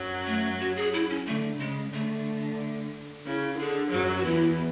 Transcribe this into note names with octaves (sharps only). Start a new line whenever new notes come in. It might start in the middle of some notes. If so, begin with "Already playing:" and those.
Already playing: F#2 F#3
A3
F#4
G#4
E4
C#4
D3 A3
C#3 G#3
D3 A3
C#3 E4
D3 G#4
F#2 F#3 F#4
F#4
E2 E3 E4